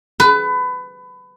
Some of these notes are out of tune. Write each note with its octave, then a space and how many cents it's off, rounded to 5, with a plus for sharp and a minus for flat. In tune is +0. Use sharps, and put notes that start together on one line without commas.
B4 +25